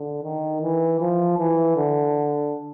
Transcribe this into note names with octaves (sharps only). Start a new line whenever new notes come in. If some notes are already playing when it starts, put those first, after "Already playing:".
Already playing: D3
D#3
E3
F3
E3
D3